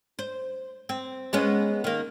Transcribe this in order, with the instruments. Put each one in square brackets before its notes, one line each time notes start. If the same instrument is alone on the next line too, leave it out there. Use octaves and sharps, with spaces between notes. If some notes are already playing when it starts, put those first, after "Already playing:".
[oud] C5
C4
G#3 B3 C#4
D#3 A#3